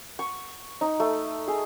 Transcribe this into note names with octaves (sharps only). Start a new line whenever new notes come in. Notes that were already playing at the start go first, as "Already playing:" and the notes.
C#6
D#4
A3
G#4